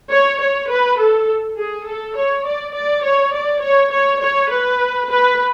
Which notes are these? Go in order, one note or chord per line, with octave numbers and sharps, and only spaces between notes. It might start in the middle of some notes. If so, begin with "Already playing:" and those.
C#5
C#5
B4
A4
G#4
A4
C#5
D5
D5
C#5
D5
C#5
C#5
C#5
B4
B4